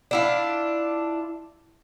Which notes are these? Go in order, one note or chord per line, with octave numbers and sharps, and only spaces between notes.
D4 E4 F4